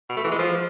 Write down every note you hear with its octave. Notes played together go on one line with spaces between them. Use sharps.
B2
A3
E3
G#3
F3